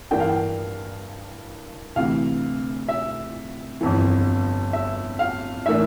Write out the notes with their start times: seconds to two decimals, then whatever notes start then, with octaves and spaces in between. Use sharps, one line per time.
0.11 G2 E3 A#3 D4 G5
0.20 F5
0.29 G5
1.96 D2 C3 E3 F5
2.88 E5
3.81 G1 F2 E3
4.73 E5
5.19 F5
5.66 A2 E3 A#3 D4 E5